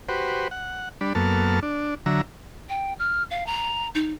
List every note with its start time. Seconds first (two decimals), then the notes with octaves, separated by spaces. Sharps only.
0.09 F#4 G4 B4 C5
0.51 F#5
1.01 G3 D4 B5
1.15 F#2 A#3 B3 A4 A5 F6
1.63 D4
2.06 D3 F#3 E5 A#5
2.69 G5
2.99 F6
3.31 F5
3.46 A#5
3.95 D#4